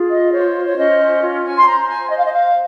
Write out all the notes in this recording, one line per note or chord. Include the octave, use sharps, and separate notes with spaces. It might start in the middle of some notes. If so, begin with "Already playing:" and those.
Already playing: F4 G#4
D#5
C5 C#5
C#5
C#4 D#5
F4
G#5
C6
C5 A#5
G#5
C5 D#5
F5
D#5
F5